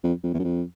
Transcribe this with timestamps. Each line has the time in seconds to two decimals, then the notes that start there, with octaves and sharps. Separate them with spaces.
0.04 F2
0.23 F2
0.34 E2
0.39 F#2
0.44 F2